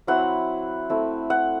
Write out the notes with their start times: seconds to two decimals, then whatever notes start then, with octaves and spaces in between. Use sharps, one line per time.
0.07 F#3 C4 E4 F#5
0.90 A3 C4 E4
1.30 F#5